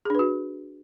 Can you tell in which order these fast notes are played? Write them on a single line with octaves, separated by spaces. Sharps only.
G#4 D4 B4 F#4